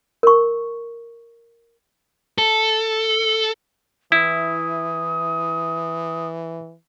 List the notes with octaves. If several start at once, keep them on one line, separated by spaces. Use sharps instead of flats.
A#4 C#6
A4
E3 E4 D#6